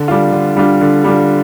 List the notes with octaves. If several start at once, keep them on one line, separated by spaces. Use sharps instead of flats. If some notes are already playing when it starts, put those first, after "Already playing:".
Already playing: D3
G3 D4 F4
D3
G3 D4 F4
D3
G3 D4 F4